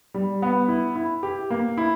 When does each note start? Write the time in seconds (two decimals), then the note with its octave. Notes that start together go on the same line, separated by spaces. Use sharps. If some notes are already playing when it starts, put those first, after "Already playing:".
0.14 G3
0.42 B3
0.68 E4
0.96 E4
1.23 G4
1.50 A#3
1.78 E4